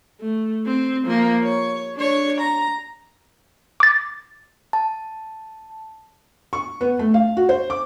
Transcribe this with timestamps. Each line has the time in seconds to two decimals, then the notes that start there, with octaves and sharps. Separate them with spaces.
0.20 A3
0.66 C4
1.06 F3 A#3
1.43 C#5
1.95 D4 C#5
2.41 A#5
3.80 D6 A6
4.73 A5
6.53 C#6
6.81 B3
6.99 A3
7.14 F5
7.37 F#4
7.49 C5
7.70 D6